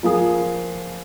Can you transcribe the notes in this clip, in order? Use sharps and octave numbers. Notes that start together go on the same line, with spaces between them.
F3 A#3 F4 G#4